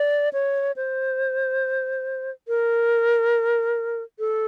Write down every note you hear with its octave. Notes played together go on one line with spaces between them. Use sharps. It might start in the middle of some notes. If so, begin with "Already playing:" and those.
Already playing: D5
C#5
C5
A#4
A4